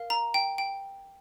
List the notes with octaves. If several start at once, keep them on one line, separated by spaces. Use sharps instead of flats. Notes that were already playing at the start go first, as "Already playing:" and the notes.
Already playing: A#4 F5
A#5
G5
G5